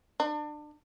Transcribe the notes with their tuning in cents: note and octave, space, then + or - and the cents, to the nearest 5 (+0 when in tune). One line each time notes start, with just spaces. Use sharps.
D4 +30